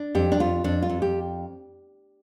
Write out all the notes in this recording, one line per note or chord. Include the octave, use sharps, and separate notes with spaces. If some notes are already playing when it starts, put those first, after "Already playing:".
Already playing: D4
F2 G4
D4
F2 F4
F2 D4
F4
F2
G4